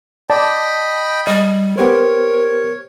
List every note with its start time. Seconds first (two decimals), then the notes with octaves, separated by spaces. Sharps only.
0.30 D5 D#5 G5 A5 B5
1.27 G3 D#5
1.77 B3 G4 A#4 C5 C#5